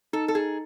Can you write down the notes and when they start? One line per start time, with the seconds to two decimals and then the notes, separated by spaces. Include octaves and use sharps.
0.13 D#4 A4
0.28 A4
0.35 G#4